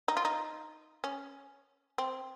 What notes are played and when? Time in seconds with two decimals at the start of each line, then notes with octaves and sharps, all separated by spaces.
0.08 D#4
0.17 F4
0.25 D#4
1.04 C#4
1.98 C4